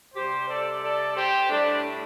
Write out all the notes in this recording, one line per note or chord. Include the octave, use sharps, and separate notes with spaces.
C3 G3 G4 C5
A4 D5
A4 D5
G4 C5
A2 G3 A3 D4